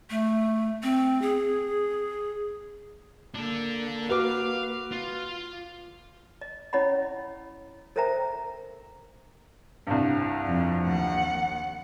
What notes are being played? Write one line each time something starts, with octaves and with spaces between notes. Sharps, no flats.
A3
C4
G#4
A#3 D4 A4
F#4 B4 F5 D6
F4
D#5
C#4 E4 C#5 D#5 F#5 B5
A4 A#4 C5 E5 G5 A#5
C2 G2
F2
D#2 F#5